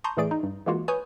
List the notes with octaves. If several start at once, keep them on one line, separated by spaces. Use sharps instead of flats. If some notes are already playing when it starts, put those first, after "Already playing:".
A5 A#5 C6 C#6 D#6 G6
A2 E3 A3 G#4 D5 D7
D#4
G2
E3 G#3 A#3 F4 F#4
B4 C#5 G#5 D#6 G6